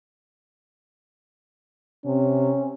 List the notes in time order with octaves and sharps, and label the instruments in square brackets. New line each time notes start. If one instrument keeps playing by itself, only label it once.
[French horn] C3 [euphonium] C#4